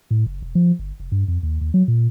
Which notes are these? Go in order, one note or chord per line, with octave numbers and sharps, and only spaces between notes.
A2
F#1
E1
F3
G1
F1
G2
F2
D#2
D#2
F#3
A#2